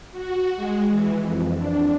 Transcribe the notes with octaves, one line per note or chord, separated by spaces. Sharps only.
F#4
G#3
E3
F2
D4